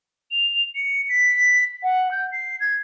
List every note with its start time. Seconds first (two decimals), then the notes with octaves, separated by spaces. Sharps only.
0.31 F7
0.75 C#7
1.09 B6
1.83 F#5
2.11 G6
2.32 C7
2.60 G#6